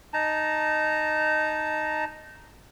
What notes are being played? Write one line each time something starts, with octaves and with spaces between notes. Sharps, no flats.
D#4 A5 A#5